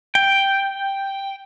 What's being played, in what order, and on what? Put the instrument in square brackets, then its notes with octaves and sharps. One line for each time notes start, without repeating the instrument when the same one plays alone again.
[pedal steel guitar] G5